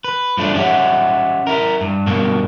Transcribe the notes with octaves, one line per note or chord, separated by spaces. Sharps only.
B4
G2 F3 A3 D4 D5
C#4 G4 C#5 E5 F#5
E4 A#4
G2
G2 B2 A#3